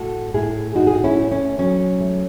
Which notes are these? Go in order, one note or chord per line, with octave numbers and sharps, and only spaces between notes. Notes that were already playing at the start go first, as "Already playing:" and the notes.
Already playing: A2 F#4 A4
A2 E4 G#4
A2 D#4 F#4
G#4
F#4
C#4 E4
A3
C#4
F#3 C#4
A3